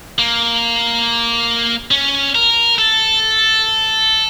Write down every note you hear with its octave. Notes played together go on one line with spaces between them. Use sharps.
A#3
C#4
A#4
A4